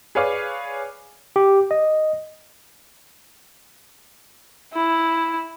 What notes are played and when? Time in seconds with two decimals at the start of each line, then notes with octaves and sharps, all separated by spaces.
0.15 G#4 B4 C#5 D5 F5
1.36 G4
1.71 D#5
4.73 E4